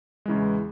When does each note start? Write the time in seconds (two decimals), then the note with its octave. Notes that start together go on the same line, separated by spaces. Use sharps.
0.26 E2 C#3 E3 G#3